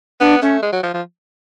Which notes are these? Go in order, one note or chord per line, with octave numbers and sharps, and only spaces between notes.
B3 D4
A3 C#4
G#3
F#3
F3
F3